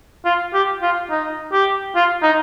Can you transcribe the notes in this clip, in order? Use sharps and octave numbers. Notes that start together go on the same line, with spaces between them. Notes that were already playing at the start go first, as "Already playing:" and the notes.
F4
G4
F4
D#4
G4
F4
D#4